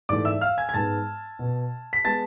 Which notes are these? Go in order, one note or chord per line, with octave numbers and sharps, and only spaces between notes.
G#2 E3 A3 D5 D6
E5 E6
F5 F6
G#5 G#6
G#6
G#2 G#3 B3 A5 A6
B2 B3
B6
G#3 B3 A5 A6